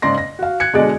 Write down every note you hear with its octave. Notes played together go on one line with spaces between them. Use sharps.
G#2 C#3 D5 C6 A#6
A#6
F#4 F5
F#6 G#6 C#7
B2 D3 G#3 G#4 D5